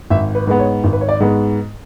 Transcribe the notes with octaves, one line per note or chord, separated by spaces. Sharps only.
G#1 E5
B4
G#2 G#3 B3 B4
C#5
G#1
B4
C#5
D5
G#2 G#3 B3